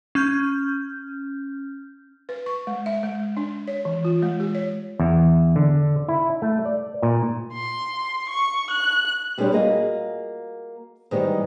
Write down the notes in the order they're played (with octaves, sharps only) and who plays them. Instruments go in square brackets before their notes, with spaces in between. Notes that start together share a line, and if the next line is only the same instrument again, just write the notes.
[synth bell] C#4 F6 G6
[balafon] B4
C#6
G#3
E5
G#3
D4
C#5
E3
F4
G#3
G4
C#5
[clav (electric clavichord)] E2
D3
E4
A3
D5
A#2
[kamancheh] C6
C#6
F#6
[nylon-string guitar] B2 G3 G#3 D4 G4 C#5
A#3 F4 F#4 G#4 D#5
G#2 D#3 E3 G3 B3 D#4